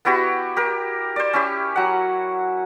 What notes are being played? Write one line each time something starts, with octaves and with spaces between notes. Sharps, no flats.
B3 E4 F#4 G4
G4 A#4
C5 D5
C#4 E4 G4
F#3 F#5